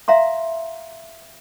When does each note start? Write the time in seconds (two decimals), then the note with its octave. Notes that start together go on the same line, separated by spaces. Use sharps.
0.08 E5 F5 A#5 C6